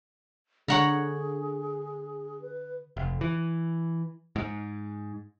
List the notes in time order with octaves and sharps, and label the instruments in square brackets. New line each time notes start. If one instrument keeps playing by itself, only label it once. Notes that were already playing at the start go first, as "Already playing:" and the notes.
[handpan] D3 [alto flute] G#4 [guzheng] C#5 F#5 A#5
[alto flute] B4
[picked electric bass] F1
E3
G#2